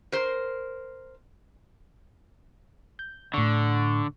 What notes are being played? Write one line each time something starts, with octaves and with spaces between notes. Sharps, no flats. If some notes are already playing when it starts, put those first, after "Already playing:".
A#4 C5
G6
A2 D3 C#6